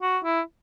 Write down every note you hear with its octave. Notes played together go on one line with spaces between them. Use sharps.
F#4
E4